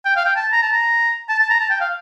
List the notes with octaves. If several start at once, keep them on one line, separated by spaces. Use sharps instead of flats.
G5
F5
G5
A5
A#5
A5
A#5
A5
A5
A#5
A5
G5
F5